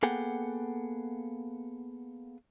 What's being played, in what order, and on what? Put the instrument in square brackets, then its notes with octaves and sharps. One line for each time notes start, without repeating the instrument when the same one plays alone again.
[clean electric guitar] A#3 B3 G#4 A4 F#5 G5